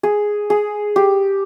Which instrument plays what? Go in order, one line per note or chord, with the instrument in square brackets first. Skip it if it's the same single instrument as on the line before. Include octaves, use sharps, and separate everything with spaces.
[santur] G#4
G#4
G4